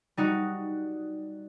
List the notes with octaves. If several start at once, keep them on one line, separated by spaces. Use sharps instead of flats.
G3 D#4 F#4